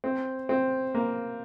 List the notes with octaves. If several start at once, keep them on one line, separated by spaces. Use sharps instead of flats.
C4
C4
A#3